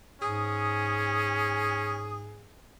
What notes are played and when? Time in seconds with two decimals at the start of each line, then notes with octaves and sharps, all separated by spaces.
0.22 G#2 C#4 G#4 D#6